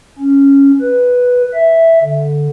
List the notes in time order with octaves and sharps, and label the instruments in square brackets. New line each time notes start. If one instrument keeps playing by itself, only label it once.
[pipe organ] C#4
B4
E5
D3